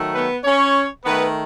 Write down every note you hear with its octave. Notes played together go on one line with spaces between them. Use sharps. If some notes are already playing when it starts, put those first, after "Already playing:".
Already playing: D#3 F#3 A3
B3 B4
C#4 C#5
D#3 A3 B3 B4